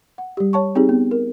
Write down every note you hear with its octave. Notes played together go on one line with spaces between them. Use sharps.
F#5
G3 G4
C#5 A5 C#6
C4 D#4 G4 G#4
B3
A#4